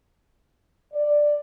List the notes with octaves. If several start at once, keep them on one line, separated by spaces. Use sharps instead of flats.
D5